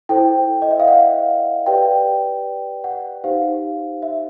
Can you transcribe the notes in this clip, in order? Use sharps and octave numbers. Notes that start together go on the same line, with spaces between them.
E4 A4 C5 G5
D#5
E5
F5
F#5
G4 B4 D5 G5
F#5
D#4 G4 C5 F5
E5